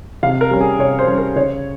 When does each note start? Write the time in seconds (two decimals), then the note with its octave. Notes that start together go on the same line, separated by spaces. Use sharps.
0.23 C3 F5
0.41 A#4
0.51 G3 C#4
0.61 G#4
0.79 C3 C#5
0.99 C5
1.08 G3 C#4
1.18 A#4
1.36 C#3 C#5